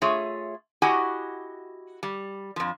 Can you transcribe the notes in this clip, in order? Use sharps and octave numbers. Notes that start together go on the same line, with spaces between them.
A3 F4 G#4 C#5 E5
E4 F#4 G4 D#5 F#5 G#5
G3
F2 F3